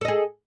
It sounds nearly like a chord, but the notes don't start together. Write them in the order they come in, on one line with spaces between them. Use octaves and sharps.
A4 D#5 G#4